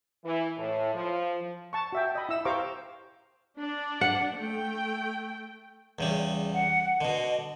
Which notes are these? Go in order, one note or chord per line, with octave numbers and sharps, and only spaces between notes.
E3
A2
F3
A5 C#6
F#4 E5 G5
D#5 B5
E4 E6
G4 C5 F5 A#5 C#6 D6
D4
F#5
A3 G5
E2 C#3 G3
F#5
B2 D3 D#5